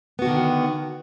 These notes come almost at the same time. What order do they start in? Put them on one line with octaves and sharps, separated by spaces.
B3 F#4 D3 D#3